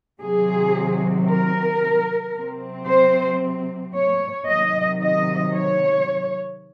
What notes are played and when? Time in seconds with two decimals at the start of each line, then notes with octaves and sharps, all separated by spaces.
0.21 C3 D#3 F#3 C4 G#4
1.27 A#4
2.34 C3 F#3 C4
2.87 C5
3.94 C#5
4.47 C3 D#3 F#3 D#5
5.01 D#5
5.55 C#5